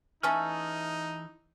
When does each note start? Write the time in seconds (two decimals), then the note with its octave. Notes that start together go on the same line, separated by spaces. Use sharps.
0.23 E3 A3 C#4 D#4 G#4 A4 F6